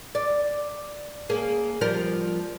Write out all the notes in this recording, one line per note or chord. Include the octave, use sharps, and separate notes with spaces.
D5
A#3 C#4 G#4
F3 G3 A#4